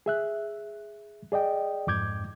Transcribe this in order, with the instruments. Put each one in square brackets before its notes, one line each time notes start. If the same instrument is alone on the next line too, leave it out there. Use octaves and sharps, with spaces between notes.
[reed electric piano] G#4 E5 F#6
G#4 D5 D#5 G5
F2 G#2 D6 G6 G#6